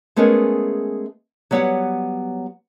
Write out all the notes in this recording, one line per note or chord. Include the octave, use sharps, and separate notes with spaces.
G#3 A3 B3 C#4 G#4 A#4
F#3 G3 B3 C#5 F5 F#5